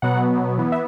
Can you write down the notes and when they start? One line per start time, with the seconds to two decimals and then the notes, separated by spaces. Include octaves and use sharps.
0.02 B2 F#3 B3 F#5
0.58 E3 B3
0.72 E5